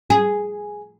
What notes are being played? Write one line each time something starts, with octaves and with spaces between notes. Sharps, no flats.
G#4